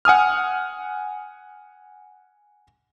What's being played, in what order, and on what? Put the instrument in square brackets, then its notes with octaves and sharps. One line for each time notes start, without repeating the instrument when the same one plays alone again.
[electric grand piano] F#5 G#5 D#6 F6